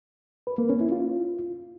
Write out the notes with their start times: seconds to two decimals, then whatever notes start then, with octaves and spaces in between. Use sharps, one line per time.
0.47 B4
0.58 A#3
0.69 C#4
0.81 E4
0.92 F4